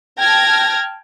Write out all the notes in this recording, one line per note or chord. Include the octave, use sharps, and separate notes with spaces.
G5 A5 F6 G#6 A#6